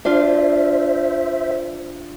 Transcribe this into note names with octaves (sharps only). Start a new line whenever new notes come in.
D4 F4 C5 E5